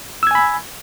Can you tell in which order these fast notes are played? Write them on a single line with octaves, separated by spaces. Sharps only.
E6 G#6 G#5 B5